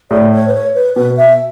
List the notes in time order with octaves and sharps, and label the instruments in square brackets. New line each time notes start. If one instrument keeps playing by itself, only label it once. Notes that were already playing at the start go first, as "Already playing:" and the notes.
[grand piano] A2 [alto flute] D5
[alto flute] C#5
B4
C#5
B4
[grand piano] B2 [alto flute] B4
[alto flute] E5